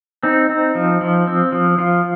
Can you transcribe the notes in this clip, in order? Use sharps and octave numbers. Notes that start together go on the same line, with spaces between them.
C4 D#4
C4
F3
F3
C4
F3
F3 F4